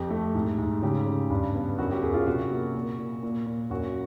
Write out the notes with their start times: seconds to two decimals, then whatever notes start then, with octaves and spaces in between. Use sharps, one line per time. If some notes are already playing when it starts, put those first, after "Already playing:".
Already playing: F2 G4
0.10 A3
0.34 G#2
0.58 G#2
0.82 C#3 G4
1.06 C#3
1.30 G2
1.55 B3
1.78 F#2 F#4
1.91 G4
2.03 F#2 G#4
2.14 F4
2.26 C3 F#4
2.51 A#3
2.75 A#2
2.98 A#2
3.23 A#2
3.46 A#2
3.70 F#2 F#4